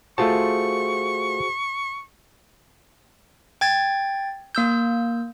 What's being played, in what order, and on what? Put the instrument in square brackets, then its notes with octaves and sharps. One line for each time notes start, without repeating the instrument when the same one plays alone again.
[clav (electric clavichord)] A3 F4 A5 [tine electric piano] F#4 G#4 C5 [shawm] C#6
[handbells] G5 G#6 A6
A#3 E6 G6